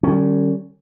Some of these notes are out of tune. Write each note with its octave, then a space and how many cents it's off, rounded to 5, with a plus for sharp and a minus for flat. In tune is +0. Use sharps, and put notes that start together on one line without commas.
D3 +45 G3 -25 C#4 +0